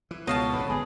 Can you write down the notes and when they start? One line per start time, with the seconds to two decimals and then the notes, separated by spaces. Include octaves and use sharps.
0.11 E3
0.27 C#2 B2 C#5 D#5 F5 A5
0.53 G#1 F2 D3 B4
0.70 G1 G#4